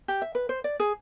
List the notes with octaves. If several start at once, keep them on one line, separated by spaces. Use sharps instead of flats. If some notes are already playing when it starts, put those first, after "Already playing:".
G4
E5
B4
C5
D5
G#4